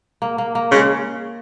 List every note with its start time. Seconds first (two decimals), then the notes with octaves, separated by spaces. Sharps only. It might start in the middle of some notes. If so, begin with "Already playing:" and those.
0.22 A#3
0.38 A#3
0.55 A#3
0.72 C#3 G#3